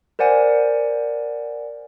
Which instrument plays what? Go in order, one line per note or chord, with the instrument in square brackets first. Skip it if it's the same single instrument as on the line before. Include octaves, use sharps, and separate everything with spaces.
[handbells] A#4 C5 D5 F#5 G#5